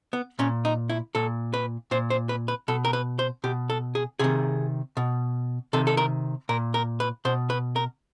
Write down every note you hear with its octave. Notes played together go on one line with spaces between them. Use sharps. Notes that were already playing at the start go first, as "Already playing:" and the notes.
B3
A#2 C#4
D#4
E4
A#2 A4
B4
A#2 C5
C5
B4
B4
B2 A4
A#4
B4
C5
B2 G4
A4
G#4
C3 D#3 G#4
B2
C3 D#3 A4
A4
A#4
A#2 A#4
A#4
B4
B2 C5
B4
A#4